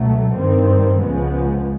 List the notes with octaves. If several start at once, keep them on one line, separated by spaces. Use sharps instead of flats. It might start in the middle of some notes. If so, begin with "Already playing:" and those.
Already playing: C#2 B2 F#3 A3
G2 D#3 G3 C4
C#2 C#3 F3 G#3 B3